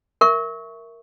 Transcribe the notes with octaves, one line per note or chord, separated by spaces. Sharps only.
A#4 E5 C#6